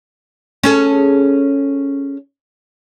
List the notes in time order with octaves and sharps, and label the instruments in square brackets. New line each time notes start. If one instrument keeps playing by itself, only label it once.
[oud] C#4 G#4 A4